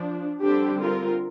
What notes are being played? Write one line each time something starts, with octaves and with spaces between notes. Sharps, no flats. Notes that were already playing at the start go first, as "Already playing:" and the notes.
Already playing: F3 D4
D3 G3 C4 D4 G4
F4 A#4